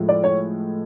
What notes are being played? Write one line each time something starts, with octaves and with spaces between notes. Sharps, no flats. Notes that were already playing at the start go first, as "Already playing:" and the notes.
Already playing: A2 F3 G#3
D5
C#5